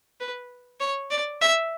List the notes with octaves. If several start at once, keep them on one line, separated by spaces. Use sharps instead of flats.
B4
C#5
D5
E5